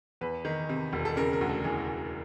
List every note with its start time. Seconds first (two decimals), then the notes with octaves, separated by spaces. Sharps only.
0.21 E2 B4
0.45 D#3
0.69 C3
0.93 E1
1.05 A4
1.17 C#3 A#4
1.33 A#4
1.41 D2
1.49 A4
1.64 E3 G#4
1.88 D2